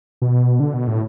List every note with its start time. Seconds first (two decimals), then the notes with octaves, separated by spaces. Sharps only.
0.22 B2
0.60 D3
0.74 B2
0.87 A2